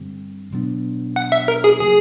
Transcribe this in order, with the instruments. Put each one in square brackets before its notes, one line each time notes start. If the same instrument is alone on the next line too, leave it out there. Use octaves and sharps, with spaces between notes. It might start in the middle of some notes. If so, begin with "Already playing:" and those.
Already playing: [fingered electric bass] G2 D3 G3 C4
B2 F#3 B3 D4
[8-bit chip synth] F#5
E5
A#4
G#4
[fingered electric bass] C#3 F#3 A#3 [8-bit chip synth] G#4